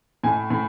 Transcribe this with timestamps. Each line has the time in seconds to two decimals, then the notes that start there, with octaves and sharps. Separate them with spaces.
0.24 A2 G#5
0.50 A2